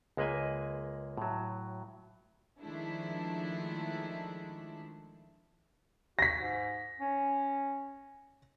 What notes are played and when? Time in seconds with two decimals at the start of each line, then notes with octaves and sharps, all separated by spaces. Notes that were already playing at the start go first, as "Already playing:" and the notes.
0.17 C#2 G#3 A#3 B4 D#5 G#5
1.17 A2 F#3
2.60 D#3 F3 G#3 A3 D4 E4
6.19 F#4 A#6 B6
6.38 G#2
7.01 C#4